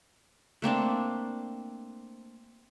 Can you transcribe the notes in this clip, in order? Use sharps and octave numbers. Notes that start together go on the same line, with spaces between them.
A3 A#3 C4 D4